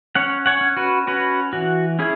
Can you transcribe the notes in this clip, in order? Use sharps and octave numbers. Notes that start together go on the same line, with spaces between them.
C#4 C#5 F#5
C#5 F#5
C#4
F#4 B4
C#4 F#4 B4
E3 F#4
C#4 E4 G#4